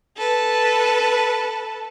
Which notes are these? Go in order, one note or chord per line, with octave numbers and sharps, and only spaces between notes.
A4 B4